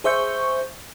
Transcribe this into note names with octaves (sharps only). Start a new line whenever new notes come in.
G#4 C5 E5 C#6 G6